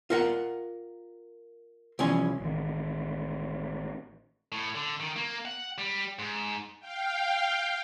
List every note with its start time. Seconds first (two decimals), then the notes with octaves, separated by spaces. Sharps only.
0.10 F4 A#4 F#5
1.99 C2 E3 F3 C#4 G#5
2.40 A1 D#3
4.52 A2
4.75 D3
5.00 D#3
5.16 A#3
5.45 F#5
5.78 G3
6.19 G#2
6.79 F5 G5